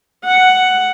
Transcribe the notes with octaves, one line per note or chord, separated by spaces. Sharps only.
F#5